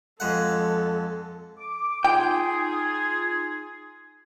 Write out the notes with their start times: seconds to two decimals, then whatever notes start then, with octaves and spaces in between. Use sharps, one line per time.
0.20 F2 G#3 A4 F#5
1.57 D6
2.04 D#4 F4 G#4 G5